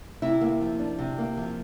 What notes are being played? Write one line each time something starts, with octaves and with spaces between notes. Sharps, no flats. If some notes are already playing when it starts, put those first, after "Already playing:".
C3 E4
A#3
F3
D4
C3
A#3
F3